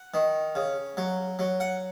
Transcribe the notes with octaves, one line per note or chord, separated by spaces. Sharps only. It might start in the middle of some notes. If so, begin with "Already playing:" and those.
Already playing: F#5
D#3
C#3
F#3
F#3
F#5